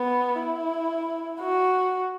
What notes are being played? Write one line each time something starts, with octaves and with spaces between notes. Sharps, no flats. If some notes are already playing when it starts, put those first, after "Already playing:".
Already playing: B3
E4
F#4